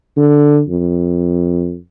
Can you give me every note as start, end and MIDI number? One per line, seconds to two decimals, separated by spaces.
0.17 0.61 50
0.69 1.76 41